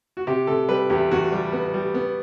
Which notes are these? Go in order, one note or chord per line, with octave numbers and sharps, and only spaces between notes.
F#4
C3 G4
C3 A4
G3 B4
E2 G4
E2 F#4
G3
B3
G3
B3